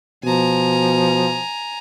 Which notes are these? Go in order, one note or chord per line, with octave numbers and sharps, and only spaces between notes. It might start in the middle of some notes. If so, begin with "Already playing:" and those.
B2 F3 G#5 A#5